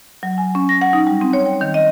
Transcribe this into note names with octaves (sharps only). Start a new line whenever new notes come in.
F#3
G#5
C#4
A#6
F#5
D#4
G3
C4
C#5
G5
D#3
D#5